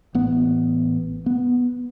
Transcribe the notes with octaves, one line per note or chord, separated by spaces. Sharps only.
A1 B3
B3